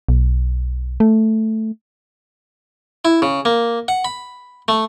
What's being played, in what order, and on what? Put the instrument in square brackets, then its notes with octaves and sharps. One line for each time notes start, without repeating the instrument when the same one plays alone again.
[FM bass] B1
A3
[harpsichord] E4
C#3
A#3
F#5
B5
A3